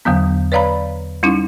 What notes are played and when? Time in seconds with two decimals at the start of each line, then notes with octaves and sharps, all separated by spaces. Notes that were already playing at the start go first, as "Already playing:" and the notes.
0.05 E2 D3 F#3 B3
0.52 B4 C#5 D5 F5 A#5 B5
1.23 G3 C#4 D#4 E4